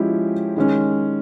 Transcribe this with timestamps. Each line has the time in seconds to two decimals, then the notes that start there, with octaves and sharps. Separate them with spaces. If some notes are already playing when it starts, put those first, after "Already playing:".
Already playing: F3 G#3 C#4 E4 G4
0.56 D#3 G#3 C#4